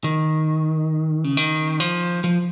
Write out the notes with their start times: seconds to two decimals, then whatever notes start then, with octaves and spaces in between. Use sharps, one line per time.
0.04 D#3
1.24 C#3
1.37 D#3
1.80 F3
2.24 F3